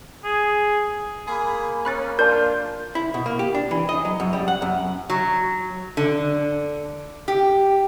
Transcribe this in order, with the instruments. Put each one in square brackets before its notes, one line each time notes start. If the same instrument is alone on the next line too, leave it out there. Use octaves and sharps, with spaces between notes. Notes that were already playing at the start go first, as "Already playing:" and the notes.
[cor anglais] G#4
[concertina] A#3 [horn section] G#4 B5
[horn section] C#4 [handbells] B5 F#6 A6
[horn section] D4 F4 [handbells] A#4 D5 A5 [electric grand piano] G6
[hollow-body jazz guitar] E4
B2
A#3
G4
D4
E3
D#5
F#3
F#2
G3
F#5
F#2
[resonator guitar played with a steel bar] F#3
D3
G4